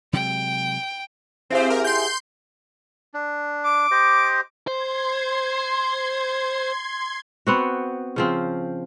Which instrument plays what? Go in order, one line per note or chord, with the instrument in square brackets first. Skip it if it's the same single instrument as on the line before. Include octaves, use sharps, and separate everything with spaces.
[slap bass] C3 F#3 G#3 [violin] G5
[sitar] G#2 E4 G4 [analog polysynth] C4 C5
[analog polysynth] A#4
C6 G6
[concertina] D4
[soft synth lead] D6
[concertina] G4 C5 D#5
[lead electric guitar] C5 [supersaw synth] C6 G#6
[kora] B3 C4 F#4
C#3 F3 C4